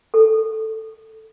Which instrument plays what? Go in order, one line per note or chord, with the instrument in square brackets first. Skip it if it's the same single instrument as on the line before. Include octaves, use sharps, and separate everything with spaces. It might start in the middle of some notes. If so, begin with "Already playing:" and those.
[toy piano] A4